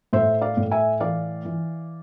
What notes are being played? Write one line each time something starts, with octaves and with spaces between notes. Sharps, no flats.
A2 C5 E5
D5 F5
A2
E5 G#5
E3 D5 F5
E3